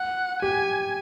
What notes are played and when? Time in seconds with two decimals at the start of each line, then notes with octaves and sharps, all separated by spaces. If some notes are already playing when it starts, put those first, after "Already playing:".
Already playing: F#5
0.42 G4 G#5